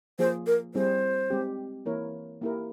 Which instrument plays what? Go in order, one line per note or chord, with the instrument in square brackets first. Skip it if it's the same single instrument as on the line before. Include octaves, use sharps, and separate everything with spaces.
[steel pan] F3 A#3 F4 G#4 [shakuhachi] C5
[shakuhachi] A#4
[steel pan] G3 C4 E4 G#4 [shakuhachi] C5
[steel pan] G#3 C4 G4
E3 A#3 E4 A#4 C#5
A#3 E4 G4 A#4